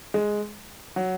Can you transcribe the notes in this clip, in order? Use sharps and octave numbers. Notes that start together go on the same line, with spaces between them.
G#3
F#3